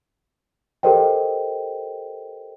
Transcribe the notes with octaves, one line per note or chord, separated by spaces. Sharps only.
G4 A4 A#4 C5 D#5 G5